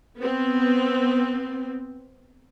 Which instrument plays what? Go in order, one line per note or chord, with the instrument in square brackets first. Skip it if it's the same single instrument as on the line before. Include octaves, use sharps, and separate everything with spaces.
[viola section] B3 C4